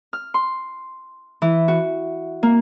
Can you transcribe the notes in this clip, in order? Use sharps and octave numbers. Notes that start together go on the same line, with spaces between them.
F6
C6
E3
F#4
A#3